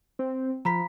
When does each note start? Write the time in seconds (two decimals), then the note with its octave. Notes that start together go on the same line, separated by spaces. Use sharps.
0.19 C4
0.65 F3 A#5 B5 B6